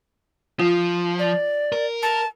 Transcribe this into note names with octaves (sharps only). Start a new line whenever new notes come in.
F3 F4
D5
A#4
A5